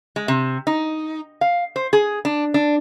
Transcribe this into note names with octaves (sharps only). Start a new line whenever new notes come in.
G#3
C3
D#4
F5
C5
G#4
D4
D4